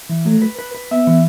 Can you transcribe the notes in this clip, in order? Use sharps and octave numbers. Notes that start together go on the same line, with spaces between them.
E3
F#3 A3
B4
B4
B4
B3 E5
E3